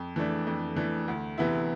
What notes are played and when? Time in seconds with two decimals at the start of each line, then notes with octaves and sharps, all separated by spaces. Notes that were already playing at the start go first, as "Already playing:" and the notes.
Already playing: F2
0.16 E3 A3 D4
0.47 F2
0.76 E3 A3 D4
1.08 D2
1.38 C3 E3 B3 E4